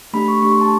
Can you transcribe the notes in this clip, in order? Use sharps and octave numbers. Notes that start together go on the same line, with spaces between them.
A3 D4 G4 B5
C#6
A3 D4 G4 C#6
C6
A5